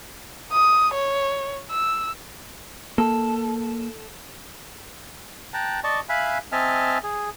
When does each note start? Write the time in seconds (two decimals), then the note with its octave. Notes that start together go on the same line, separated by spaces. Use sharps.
0.52 D#6
0.94 C#5
1.71 E6
2.98 A#3 A4
5.54 G5 A5 A#5 F#6
5.84 D5 D#5 A5 C#6
6.09 E5 F5 G#5 B5 F#6
6.52 C4 D#5 E5 G#5 A5 F6
7.03 G#4